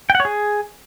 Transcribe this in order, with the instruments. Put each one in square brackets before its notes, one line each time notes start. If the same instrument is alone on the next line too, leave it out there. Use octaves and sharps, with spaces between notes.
[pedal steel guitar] G5
F#5
C#5
G#4